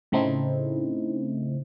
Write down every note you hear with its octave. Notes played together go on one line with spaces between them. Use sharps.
A2 C#3 A3 C4 D#4 E4